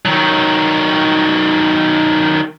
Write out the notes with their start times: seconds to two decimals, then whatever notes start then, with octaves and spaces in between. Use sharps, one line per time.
0.06 D#3 F#3